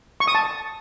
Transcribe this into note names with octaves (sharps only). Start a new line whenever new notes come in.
C#6
D#6
A5